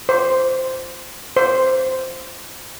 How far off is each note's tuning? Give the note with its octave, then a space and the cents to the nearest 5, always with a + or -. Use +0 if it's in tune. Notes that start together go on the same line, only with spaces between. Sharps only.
C5 -5
C5 -5